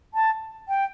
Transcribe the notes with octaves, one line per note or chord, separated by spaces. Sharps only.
A5
G5